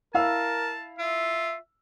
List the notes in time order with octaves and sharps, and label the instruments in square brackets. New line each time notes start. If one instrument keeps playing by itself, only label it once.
[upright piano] E4 F5 E6 [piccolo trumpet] A#4 [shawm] A5
[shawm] F4 [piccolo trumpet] E5